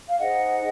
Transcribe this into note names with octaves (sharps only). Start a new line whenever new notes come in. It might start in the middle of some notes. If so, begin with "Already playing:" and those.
F5
D#4 G#4 C5 D#5 F#5